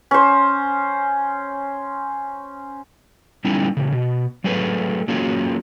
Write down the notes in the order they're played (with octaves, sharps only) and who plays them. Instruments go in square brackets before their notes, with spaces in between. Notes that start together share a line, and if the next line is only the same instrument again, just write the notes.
[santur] C#4 C5
[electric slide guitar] G3 B3 C#4 D#4 E4
A#2 C#3
B2
F#3 A3 G#4 B4
F#3 A#3 C#4 F4 G#4